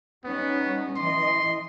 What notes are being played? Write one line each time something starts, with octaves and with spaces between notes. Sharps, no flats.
G3 B3 C#4 D#4
E3 D#5 C6